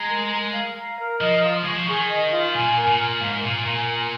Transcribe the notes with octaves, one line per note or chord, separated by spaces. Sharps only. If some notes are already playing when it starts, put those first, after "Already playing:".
Already playing: G#3 A#5
A#4
A#4
F5
A#5
A#4
F3 D#5
F4
G#3 C#6
F3
D#3 G#4
D#5
F4
A#2 G#5
A#4
A#2
A#4
G#2 F5
A#2 G#5
A#2 A#4
G#5